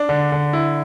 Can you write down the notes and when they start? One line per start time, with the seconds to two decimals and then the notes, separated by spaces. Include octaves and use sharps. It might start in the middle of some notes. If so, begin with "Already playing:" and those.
Already playing: D4
0.09 D3
0.32 D3
0.53 E4